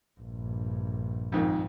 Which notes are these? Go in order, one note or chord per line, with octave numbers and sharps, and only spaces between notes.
A#1 G2
F2 G#2 D#3